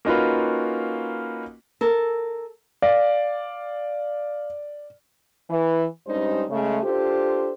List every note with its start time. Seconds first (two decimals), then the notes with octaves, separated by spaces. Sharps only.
0.05 A#3 C#4 D#4 F4 F#4 B4
1.81 A4 A#4
2.82 D5 F5
5.49 E3
6.06 G2 G3 G#3 C#4 D#4 C5
6.49 C#3 G#3 A3
6.83 D4 F4 G4 A4 C5